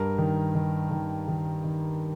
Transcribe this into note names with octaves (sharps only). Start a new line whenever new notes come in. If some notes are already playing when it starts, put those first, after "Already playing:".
Already playing: G2 A#4
D#3
D#3
D#3
D#3
D#3